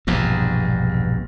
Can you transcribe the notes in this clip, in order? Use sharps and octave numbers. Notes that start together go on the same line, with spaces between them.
E1 A#1 E2 G2